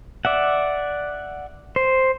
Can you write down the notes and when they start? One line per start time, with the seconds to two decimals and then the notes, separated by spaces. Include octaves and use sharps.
0.25 D5 E5 F#5
1.76 C5